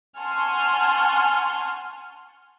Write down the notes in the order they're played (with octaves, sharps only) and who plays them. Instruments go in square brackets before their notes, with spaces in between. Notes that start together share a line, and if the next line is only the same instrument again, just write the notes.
[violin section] F#5 G#5 A5 C6 C#6 F6